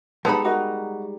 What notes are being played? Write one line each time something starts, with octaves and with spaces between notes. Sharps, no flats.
G3 G#3 B3 D#4 A4 B5
F#4 A#4 D#5